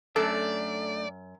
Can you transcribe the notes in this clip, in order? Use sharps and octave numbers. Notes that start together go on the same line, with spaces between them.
F#2 A3 D4 A4 D5